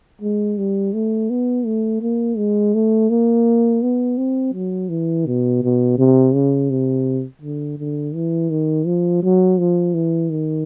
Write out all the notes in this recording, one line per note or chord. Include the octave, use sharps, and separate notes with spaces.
G#3
G3
A3
B3
A3
A#3
G#3
A3
A#3
B3
C4
F#3
E3
B2
B2
C3
C#3
C3
D3
D3
E3
D#3
F3
F#3
F3
E3
D#3